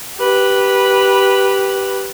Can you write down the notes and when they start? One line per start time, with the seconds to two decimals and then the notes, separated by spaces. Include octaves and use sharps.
0.18 G4 B4